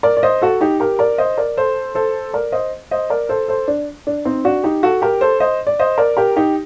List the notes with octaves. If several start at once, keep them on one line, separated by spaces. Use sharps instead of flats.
A#4 D5
D5
C5 D#5
F#4 A4
D#4 G4
G4 A#4
A#4 D5
C5 D#5
A#4 D5
A4 C5
A4 C5
A#4 D5
C5 D#5
C5 D#5
A#4 D5
A4 C5
A4 C5
D4
D4
C4 D#4
D4 F#4
D#4 G4
F#4 A4
G4 A#4
A4 C5
C5 D#5
D5
C5 D#5
A#4 D5
G4 A#4
D#4 G4